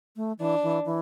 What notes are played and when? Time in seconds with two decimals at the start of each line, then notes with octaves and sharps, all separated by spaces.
0.16 A3
0.39 E3 D4
0.63 E3
0.85 E3